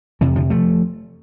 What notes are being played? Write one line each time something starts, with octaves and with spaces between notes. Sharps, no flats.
F2 C3 E3
D3 F3
F3 A3